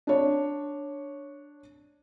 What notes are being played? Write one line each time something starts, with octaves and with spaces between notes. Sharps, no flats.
D4 C#5